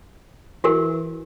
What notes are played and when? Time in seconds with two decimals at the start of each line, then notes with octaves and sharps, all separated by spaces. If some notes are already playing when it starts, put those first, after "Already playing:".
0.64 E3 F#4 G4 A#4